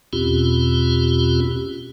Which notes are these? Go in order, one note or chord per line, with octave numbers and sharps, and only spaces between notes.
E2 B2 C4 C#4 F4 G4